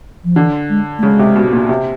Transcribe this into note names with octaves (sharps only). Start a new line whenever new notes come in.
F3
D3 E3
G#3
A3
C#3 G#3
C3
B2
A#2
C3